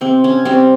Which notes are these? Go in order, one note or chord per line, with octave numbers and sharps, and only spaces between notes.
C3 C4
C#4
G3 C4